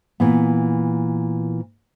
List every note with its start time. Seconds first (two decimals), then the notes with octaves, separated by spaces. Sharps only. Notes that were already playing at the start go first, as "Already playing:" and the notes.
0.20 A#2 E3 B3